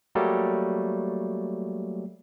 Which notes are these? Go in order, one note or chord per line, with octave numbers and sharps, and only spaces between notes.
F#3 G3 A3 A#3